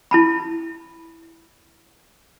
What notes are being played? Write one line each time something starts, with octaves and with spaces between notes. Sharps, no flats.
E4 A5 B5